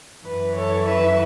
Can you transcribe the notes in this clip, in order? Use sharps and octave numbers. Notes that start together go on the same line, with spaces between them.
F#2 E3 B4
A4 C#5
B4 E5